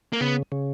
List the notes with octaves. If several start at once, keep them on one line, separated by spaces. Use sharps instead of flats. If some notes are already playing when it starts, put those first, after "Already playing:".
A#3
C#3 B3
C#3